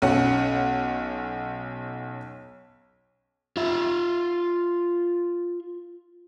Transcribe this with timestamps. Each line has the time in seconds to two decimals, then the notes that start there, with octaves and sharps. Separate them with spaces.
0.02 B1 C#4 F#5
3.57 F4 E5